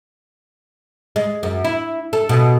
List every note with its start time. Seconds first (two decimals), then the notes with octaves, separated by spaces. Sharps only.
1.16 G#3
1.43 F#2
1.64 E4
2.13 A4
2.29 B2